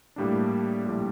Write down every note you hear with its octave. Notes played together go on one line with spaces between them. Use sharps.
A2 G3 A#3 D4
A#1 A2 G3